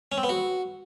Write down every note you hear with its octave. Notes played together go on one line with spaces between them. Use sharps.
C#4
C4
B3
F#4